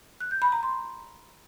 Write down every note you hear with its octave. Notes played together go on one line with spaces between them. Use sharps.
F#6
G6
B5
A#5
C6